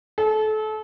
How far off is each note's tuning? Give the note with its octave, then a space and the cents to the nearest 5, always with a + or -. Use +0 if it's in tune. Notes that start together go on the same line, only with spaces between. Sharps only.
A4 -30